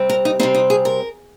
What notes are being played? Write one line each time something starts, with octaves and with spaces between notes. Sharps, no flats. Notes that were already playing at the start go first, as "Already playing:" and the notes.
Already playing: C3 G3 C4
A#4
D#4
C3 G3 C4 D#4
D#4
G#4
A#4